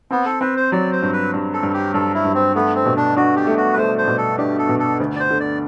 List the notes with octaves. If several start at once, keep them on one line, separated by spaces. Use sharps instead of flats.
B3 C4
A4
C4 B4
C5
F#3 D5
C5
G2
B4
G2
A4
G2
G4
G2 A4
E4
G2
C4
A3 B3
C4
B2
D4
D4 F#4
G4
A3
F#4
B4
A3 C5
C5
B2
A4
D4 G4
A4
B2
A4
D2
D5
C5
D3
D5